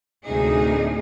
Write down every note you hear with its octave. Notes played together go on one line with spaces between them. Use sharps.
D2 A2 C3 D#4 G#4